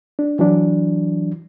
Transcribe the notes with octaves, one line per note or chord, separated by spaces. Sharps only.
D4
E3 F#3 D4